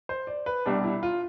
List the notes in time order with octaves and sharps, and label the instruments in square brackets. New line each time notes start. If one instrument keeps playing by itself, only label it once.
[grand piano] C5
D5
B4
[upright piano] C2 B2 G3 D4
[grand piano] E4
F4